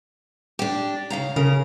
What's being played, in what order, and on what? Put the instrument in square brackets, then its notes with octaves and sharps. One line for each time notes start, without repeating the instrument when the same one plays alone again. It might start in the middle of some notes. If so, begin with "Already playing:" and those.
[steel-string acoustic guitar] D4 G4
C#3 F5 A#5
[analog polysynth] C#3 [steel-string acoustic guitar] A#4